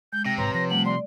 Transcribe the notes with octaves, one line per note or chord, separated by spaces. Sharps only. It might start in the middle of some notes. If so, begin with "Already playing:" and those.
G#3 G6
C3 G5 A#6
A1 G#2 B4 C#5 A#5 C6
F3 A#6
G3 A3 F#5 F#7
D5 C6